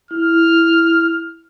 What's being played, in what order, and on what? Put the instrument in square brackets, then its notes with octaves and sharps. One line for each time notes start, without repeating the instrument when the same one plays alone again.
[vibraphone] E4 [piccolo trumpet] F6